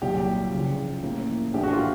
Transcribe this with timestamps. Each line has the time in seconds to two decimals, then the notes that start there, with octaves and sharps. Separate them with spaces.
0.02 C2 A#2 F#3 G4
0.53 C#2 C#3 F3
1.03 A2 F3 A#3 C#4
1.54 A#1 A2 E3 A3 G4
1.63 F#4
1.73 F4